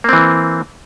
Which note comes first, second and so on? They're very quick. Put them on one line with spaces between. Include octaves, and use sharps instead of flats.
A#3 C4 E3